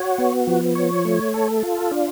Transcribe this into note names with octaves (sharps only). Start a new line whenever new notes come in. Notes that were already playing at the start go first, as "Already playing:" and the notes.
Already playing: F#4 C#5
B3
F3
C#5
A3
A4
F4
D4